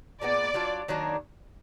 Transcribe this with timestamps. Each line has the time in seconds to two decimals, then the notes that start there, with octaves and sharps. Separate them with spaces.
0.21 A#2 G#3 B3 D5
0.54 F#3 D4 F4
0.88 D#3 F#3 A#3 D4